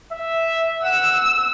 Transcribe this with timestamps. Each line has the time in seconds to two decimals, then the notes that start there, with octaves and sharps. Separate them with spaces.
0.13 E5
0.83 F#5 E6